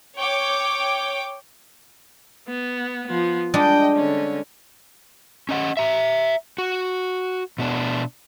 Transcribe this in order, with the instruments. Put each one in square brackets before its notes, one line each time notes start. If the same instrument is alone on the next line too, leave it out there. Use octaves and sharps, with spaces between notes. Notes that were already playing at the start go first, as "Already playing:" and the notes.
[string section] C#5 G5 D6
[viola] B3
F3 B3
[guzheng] G3 G#3 D4 [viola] D#5 G5
[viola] D3 C#4
[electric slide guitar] C#4 D#5 F#5
E5 A#5
F#4
B2 B3 D4